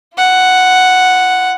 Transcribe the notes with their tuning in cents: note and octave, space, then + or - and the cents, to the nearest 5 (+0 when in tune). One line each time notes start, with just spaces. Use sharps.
F4 -35 F#5 +0